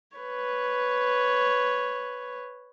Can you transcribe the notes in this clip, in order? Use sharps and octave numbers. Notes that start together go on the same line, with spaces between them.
B4 C#5